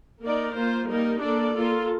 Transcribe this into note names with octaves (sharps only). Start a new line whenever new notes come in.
A#3 D#4 A#4 D5
A#3 F4 C5
G3 A#3 D#4 A#4
A#3 D4 A4 D5
A#3 F4 A4